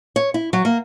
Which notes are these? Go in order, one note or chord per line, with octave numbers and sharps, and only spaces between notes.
C#5
E4
F#3
A#3